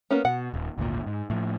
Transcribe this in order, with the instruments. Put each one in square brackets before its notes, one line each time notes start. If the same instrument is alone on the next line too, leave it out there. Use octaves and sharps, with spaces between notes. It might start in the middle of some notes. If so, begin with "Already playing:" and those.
[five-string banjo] A#3 B3 C#4
[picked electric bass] B2 [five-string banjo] F#5
[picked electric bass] D#1
G#1 D2 A#2
G#2
A2 F3